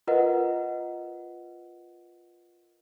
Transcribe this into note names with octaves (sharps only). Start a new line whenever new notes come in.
F4 A#4 B4 D#5 F#5